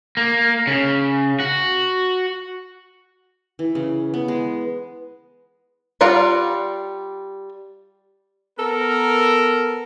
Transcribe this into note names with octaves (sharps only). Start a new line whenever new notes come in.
A#3
C#3
F#4
E3
C#3
B3
G#3
G3 F4 D5 F#5 A#5
B3 A4 A#4